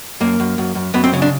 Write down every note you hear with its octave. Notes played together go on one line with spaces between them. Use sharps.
F#2 A#3
F#2
F#2
F#2
F#2 B3
C4
C#3 C#4
D4